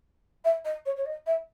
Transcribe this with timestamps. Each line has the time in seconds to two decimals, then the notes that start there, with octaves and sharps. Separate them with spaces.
0.45 E5
0.65 D#5
0.86 C#5
0.97 C#5
1.06 D#5
1.26 E5